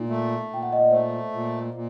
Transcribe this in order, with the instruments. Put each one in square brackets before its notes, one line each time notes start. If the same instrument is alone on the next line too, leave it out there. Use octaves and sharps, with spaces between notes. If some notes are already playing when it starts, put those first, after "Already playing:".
Already playing: [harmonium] A#2 [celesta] D#4
[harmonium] A3
[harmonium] A#2 [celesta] G5
[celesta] F#5
D#5
D5
[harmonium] A3 [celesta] C5
[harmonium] A#2
A#2